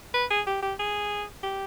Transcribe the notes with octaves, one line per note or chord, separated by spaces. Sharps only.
B4
G#4
G4
G4
G#4
G4